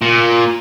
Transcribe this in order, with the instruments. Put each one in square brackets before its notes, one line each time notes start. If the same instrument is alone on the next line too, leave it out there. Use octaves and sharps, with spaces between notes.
[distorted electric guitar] A#2